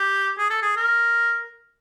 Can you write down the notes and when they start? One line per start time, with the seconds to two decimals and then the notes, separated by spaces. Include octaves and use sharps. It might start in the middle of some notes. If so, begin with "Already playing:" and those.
Already playing: G4
0.39 G#4
0.50 A4
0.62 G#4
0.76 A#4